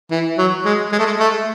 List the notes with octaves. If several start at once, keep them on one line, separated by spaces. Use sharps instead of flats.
E3
F#3
G#3
G#3
A3
G#3
A3